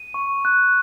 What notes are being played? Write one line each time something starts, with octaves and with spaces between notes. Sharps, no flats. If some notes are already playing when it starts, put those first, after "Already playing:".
Already playing: D#7
C#6
F#6